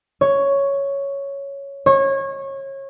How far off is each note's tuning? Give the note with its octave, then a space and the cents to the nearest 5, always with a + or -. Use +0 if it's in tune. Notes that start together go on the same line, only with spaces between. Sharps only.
C#5 +5
C#5 -25